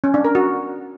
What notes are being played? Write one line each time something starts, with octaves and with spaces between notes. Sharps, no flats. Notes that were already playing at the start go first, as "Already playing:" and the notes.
C#4
D4
A#4
F#4